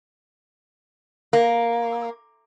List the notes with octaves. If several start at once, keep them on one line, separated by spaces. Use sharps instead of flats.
A#3